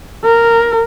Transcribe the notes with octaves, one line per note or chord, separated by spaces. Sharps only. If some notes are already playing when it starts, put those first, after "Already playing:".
A#4